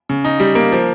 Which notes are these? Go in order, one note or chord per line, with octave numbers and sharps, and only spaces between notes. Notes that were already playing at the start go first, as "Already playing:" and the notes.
C#3
D#4
G3
A#3
F3